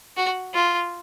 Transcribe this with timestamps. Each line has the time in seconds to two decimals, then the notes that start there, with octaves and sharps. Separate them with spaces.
0.17 F#4
0.54 F4